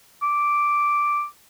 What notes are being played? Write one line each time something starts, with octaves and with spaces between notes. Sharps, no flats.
D6